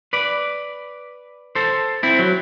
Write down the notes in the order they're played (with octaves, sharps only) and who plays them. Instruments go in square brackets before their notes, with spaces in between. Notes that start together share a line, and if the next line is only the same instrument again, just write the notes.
[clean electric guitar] B4 D5
A4 C5
C4 E4
F#3